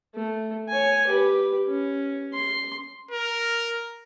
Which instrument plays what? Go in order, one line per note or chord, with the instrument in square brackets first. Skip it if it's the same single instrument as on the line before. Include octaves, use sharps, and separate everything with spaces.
[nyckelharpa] A3
C#5 G#5
G4 B4
C#4
C6
[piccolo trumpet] A#4